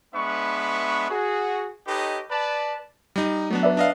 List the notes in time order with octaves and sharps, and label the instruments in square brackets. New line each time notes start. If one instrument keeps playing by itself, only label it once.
[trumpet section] G#3 B3 D4 B4 E5 C#6
F#4 G#4
D#4 G4 A4 B4 C#5 D#5
B4 D5 A5
[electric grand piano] G3 D#4
[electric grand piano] F#3 B3 D4 [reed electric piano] A3
[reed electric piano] B4 D5 E5
[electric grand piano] D4 D#5 F5